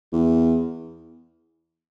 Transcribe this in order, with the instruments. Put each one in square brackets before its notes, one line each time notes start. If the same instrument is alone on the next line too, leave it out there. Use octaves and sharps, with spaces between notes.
[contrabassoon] E2